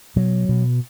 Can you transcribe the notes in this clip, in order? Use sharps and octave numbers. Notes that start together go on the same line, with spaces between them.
B2 F#3
B2